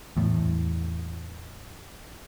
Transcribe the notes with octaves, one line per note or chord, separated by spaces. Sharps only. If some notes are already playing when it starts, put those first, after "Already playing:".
E2 A2